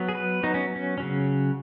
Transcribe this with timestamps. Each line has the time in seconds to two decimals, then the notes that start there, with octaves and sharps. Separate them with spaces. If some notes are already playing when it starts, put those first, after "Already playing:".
Already playing: F#3 B3
0.09 G#4
0.15 B4
0.43 F#3 B3 D#4
0.54 C#4
0.76 C#4
0.98 C#3 F#3 C#4